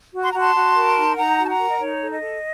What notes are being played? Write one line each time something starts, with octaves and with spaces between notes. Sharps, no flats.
F#4
C6
A#5
F#4 A5 C6
F#4
A#4
D#4
D#4 F#5 A#5
F#4
A5
F#5 A#5
A#4
D#5
D#4 C#5
A4
D#5
A4